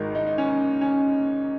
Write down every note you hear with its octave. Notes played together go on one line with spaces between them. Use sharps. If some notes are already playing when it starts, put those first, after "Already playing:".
Already playing: G#1 G#2 D#3 A#4
D#4
D#4
C#4
C#4